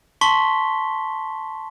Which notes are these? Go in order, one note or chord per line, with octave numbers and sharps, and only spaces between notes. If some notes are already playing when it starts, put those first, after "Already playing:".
A5 C6 C#6 B6 G7